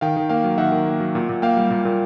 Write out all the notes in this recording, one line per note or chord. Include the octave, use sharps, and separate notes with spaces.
D#3 F5 G5
D#3
A#3 F5 G5
F#3
D#3 E5 F#5
D#3
A#3
F#3
A#2
A#2
A#3 F5 G5
G3
A#2
A#2